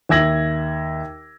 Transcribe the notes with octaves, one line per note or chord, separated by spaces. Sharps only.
D#2 E5 E6 G#6 A#6 F#7